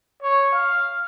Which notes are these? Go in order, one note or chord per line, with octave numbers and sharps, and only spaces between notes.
C#5
F5